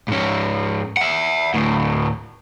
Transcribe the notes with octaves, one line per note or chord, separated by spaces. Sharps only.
G#2 C#4
E5 F#5
D2 A2